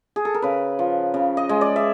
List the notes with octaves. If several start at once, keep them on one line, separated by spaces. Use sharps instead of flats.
G#4
A4
A#4
C#3 B4
F3
C#3
D#5
G#3
D5
E5